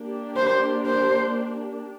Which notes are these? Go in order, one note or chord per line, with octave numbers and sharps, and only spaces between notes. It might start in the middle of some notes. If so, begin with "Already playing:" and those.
Already playing: A#3 D4 G4
C5
C5